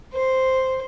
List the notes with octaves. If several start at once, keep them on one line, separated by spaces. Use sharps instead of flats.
C5